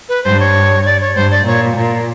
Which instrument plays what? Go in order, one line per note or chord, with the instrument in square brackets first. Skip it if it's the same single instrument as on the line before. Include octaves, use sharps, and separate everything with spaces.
[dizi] B4
[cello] G2 [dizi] C5
[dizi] C#5
D5
C#5
[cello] G2 [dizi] C5
[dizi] D5
[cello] A#2 [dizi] C#5
[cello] A#2